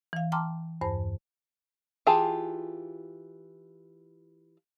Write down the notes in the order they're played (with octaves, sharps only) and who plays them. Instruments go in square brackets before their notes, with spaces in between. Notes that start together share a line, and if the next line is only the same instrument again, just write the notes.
[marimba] E3 F5
G5 A5 A#5 C6 D6 F6
E2 G2 C5 A5
[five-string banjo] E3 F4 G4 G#4 A5